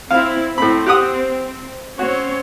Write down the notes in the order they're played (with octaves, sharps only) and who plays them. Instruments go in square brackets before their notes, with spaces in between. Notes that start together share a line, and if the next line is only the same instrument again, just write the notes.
[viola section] C4 E4 [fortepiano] F5
[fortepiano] A2 B5 [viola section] C4
[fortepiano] G4 F#5 D#6
[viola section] C4 C#4 C#5 [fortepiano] F#4